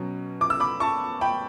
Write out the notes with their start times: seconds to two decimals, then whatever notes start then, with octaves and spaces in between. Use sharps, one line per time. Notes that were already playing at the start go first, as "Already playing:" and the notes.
Already playing: B2 F#3 C#4
0.41 D6
0.50 E6
0.60 B5 D6
0.80 A5 C#6
1.21 G5 B5